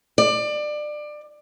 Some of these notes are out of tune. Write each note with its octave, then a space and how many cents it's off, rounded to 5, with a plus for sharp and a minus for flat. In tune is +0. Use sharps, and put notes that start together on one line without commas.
D5 +25